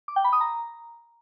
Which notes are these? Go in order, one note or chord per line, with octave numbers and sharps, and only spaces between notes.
D6
G5
B5
D#6
A#5